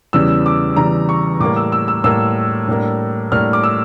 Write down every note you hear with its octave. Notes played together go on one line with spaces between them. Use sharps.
E2 C#3 E3 G3 E6
D6
E2 C#3 E3 G3 A#5
C#6
A2 G3 A#3 D6
E6
E6
E6
A2 G3 A#3 E6
A2 G3 A#3 D4
A2 G3 A#3 D4 F6
D6
E6